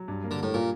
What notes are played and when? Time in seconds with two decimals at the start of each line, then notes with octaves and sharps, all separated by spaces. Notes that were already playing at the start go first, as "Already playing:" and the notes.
Already playing: F#3
0.08 G2
0.24 A#3
0.31 D3
0.38 A2 A#3
0.54 A#2 A#3